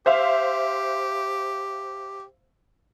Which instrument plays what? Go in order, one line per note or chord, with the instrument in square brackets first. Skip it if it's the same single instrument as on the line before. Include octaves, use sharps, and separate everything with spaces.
[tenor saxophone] G4 [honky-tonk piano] C5 E5 F5